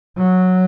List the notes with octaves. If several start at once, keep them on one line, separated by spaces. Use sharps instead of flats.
F#3